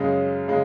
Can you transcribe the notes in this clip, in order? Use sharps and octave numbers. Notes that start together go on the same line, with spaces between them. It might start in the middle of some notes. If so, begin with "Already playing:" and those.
Already playing: F#2 C#3 G#3 C#4
C#3 G#3